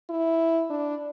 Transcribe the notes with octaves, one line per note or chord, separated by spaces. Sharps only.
E4
D4